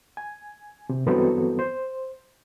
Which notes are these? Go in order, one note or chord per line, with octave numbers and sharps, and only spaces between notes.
G#5
C3
G2 E3 F#3 B3 C4 A4
C5